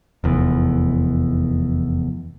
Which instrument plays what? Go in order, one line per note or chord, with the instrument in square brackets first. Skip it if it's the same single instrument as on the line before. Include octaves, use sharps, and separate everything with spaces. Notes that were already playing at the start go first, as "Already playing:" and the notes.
[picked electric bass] F1 E2